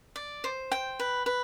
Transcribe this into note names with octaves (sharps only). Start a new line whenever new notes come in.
D5
C5
G5
B4
B4